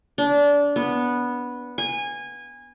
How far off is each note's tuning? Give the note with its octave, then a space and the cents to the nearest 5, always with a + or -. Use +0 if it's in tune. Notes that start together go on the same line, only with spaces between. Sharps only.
D4 -25
B3 -10
G#5 -20